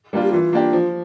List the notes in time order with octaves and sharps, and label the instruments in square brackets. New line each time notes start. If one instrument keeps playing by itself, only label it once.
[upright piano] G3 A#3 D4 F4
[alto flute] G4
[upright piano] E3 [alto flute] F4
[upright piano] A#3 D4 G4
F3